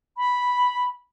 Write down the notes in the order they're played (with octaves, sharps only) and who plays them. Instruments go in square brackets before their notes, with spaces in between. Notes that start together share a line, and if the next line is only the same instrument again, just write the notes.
[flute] B5